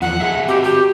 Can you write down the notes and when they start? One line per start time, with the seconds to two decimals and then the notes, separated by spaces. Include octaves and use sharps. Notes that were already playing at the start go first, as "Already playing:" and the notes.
0.02 E2 F3 F#5
0.20 G#4 D#5 E5
0.48 C4 F#4 G4
0.64 G4